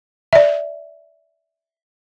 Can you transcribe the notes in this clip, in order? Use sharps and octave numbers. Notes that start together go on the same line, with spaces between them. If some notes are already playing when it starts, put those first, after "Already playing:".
D5 E5